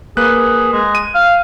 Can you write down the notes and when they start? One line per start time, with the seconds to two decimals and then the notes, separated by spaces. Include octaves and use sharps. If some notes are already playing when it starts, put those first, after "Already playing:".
0.17 A#3 G#4 B4 F#6
0.72 G#3
0.95 D#7
1.15 F5